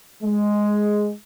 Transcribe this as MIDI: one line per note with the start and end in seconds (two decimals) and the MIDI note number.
0.23 1.12 56